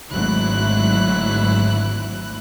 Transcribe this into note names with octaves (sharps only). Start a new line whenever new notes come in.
G#1 D2 G#2 F#3 E4 F#6